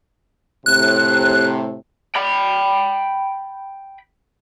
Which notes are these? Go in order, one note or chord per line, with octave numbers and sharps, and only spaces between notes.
A2 C3 F#6
G5 B5